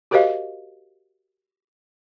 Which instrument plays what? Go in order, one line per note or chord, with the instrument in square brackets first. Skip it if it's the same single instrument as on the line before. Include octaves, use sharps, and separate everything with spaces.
[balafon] F#4 G4 A#4 C5 D#5 F5